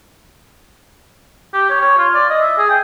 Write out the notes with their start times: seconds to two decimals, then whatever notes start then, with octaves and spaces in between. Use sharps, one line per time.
1.54 G4
1.70 C#5
1.81 C#5
1.98 F4
2.14 D5
2.30 D#5
2.41 E5
2.58 G#4
2.69 G5